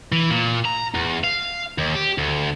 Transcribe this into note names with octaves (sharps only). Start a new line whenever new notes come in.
E3
A#2
A#5
E2
F5
D#2
G4
D2